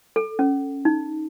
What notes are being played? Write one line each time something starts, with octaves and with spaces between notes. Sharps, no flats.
A4
C#4
D#4